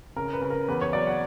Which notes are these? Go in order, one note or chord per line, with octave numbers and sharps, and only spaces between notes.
C#3 A#4
B4
C#3
A#4
E2 B4
C#5
F#3 D5
F#5